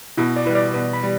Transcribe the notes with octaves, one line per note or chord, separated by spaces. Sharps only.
B2 E4
D5
G3 E4 B4
D5
B2 B4
B5
G3